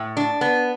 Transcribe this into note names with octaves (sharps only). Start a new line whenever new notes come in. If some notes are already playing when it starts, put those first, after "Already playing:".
Already playing: A2
D4
B3